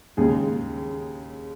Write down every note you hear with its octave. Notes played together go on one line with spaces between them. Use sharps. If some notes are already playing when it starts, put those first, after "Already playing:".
D#2 C#3 G#3 G#4